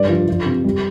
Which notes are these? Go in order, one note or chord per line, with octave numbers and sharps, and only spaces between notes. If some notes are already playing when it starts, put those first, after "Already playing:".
Already playing: G2 D5
F3
F3
C3
G3